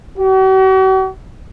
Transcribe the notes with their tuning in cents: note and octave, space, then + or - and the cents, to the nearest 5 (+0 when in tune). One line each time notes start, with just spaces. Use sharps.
F#4 +45